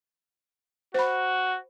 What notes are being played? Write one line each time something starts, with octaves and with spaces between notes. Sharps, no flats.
F#4 C5 B5